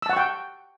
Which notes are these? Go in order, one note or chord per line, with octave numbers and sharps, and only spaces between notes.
F#5 G5 A5 C#6 E6